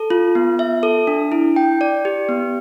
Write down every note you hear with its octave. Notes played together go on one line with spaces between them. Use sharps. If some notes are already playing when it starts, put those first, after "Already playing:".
Already playing: A4
F4
B3
E5
A4
D4
E4
G5
D5
G4
B3